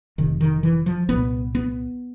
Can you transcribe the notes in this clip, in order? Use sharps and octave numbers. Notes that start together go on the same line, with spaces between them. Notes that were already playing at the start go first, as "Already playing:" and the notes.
F1 F2 C3 D#3
D#3
E3
F3
C2 A#2 B3
B3